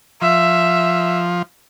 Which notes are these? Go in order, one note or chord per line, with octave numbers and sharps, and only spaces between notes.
F3 E5